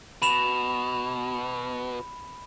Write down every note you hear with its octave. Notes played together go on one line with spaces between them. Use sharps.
B2 B5 E7 F7